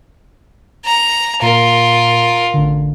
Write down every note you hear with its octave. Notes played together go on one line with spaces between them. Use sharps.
A#5
A#2 F4 A#4
A1 D3